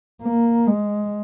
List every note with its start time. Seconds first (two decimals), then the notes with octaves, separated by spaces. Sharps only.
0.22 A#3
0.67 G#3